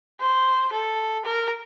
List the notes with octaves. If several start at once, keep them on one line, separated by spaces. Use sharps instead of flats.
C5
A4
A#4